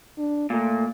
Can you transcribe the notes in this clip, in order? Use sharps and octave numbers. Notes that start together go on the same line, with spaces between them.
D4
A#2 A3